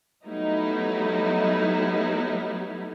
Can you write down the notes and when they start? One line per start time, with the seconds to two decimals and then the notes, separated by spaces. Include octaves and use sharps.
0.24 F#3 G3 A3 B3 D#4 E4